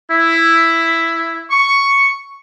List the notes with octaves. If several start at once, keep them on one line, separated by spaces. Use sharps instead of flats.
E4
C#6